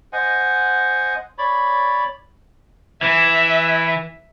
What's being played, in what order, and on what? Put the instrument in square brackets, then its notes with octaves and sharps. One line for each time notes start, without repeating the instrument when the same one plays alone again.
[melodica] C5 D#5 F#5 G#5
C#5 D5 B5
[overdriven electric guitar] E3 [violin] E5